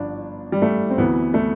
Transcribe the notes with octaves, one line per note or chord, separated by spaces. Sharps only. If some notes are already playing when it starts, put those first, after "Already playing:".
Already playing: G1 G2 F3 D4
G3
A3
C4
D2 C3 E3 B3
A3